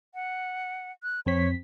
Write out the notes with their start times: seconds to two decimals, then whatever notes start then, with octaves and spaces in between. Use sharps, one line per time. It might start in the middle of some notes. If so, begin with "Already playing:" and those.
0.14 F#5
1.03 F#6
1.26 F2 C4 C#5 B6